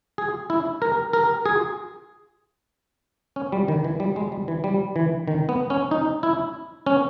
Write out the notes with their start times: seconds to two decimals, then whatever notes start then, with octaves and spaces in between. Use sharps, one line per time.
0.18 G#4
0.50 E4
0.82 A#4
1.13 A#4
1.46 G#4
3.36 C#4
3.52 G3
3.68 D#3
3.84 E3
4.00 G3
4.16 G#3
4.32 G3
4.48 E3
4.64 G3
4.96 E3
5.28 D#3
5.49 B3
5.70 C#4
5.91 D#4
6.23 E4
6.86 C#4